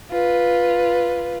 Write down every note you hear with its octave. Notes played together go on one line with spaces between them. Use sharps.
F4 B4